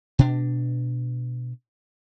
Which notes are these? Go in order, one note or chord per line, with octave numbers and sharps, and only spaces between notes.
B2 D4